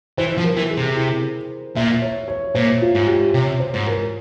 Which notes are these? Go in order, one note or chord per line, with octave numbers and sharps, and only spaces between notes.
E3 C5
F3
A#4
E3
G#4
C3
E4
A#2 E5
C#5
C#5
A#2 C5
F4
G#2
G4
C3 C#5
C5
G#2
A#4